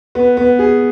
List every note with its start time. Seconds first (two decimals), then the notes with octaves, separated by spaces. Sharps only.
0.15 B3
0.37 B3
0.59 G#4